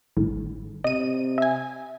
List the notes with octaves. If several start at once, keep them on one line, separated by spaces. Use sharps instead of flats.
G#1 A2
C3 D#5 D#7
E5 G#5